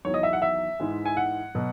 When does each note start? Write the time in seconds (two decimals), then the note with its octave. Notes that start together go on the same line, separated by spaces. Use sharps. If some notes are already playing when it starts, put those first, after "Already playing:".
0.05 E2 D#3 F#3 C#5
0.14 D#5
0.23 E5
0.33 F#5
0.42 E5
0.80 G#2 E3 G#3
1.05 G#5
1.17 F#5
1.55 B2 F#3